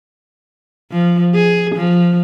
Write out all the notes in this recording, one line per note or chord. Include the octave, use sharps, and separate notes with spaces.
F3
G#4
F3